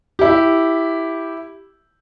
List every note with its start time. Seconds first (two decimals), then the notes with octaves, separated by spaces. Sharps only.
0.19 E4 G4